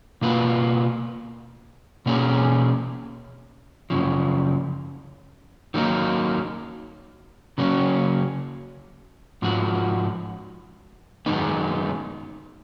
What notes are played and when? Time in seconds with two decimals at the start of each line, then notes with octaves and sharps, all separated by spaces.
0.22 B2 A#3 F4 B4
2.06 B2 A#3 C#4 G#4
3.90 F#2 C#3 F3
5.74 D#3 F#3 A#3 D#4
7.58 C#3 F#3 A#3 C#4
9.42 G#2 F3 F#4
11.26 F#2 D#3 G#3 B3 D#4